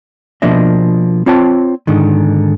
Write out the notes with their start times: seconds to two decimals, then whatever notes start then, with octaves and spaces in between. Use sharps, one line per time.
0.42 B2 F3 A#3 D4 D#5 E5
1.26 C4 F4 C#5 G5 A5
1.87 G#2 D3 D#3